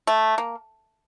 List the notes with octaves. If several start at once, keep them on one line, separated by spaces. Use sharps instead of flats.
A3
A#3